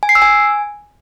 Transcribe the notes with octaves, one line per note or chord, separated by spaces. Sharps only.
G#5
C7
E6
G#5